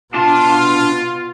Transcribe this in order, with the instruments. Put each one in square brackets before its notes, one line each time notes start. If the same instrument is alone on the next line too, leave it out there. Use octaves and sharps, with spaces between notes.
[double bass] B2 [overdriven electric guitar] D4 A5 [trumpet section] F4